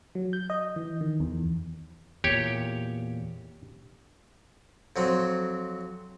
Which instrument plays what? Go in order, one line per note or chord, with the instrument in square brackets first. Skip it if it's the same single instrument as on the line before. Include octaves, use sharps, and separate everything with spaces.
[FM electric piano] F#3
G6
D#5
E3
D#3
E2
[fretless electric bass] E2 A#2 [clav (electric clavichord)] G4 C#5
[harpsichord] F2 F#3 C4